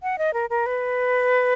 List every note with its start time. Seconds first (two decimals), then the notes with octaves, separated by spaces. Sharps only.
0.03 F#5
0.18 D#5
0.34 A#4
0.50 A#4
0.66 B4